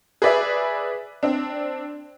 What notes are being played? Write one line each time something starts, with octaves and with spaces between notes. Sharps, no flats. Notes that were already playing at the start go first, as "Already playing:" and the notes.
G#4 B4 D5 E5
C4 D4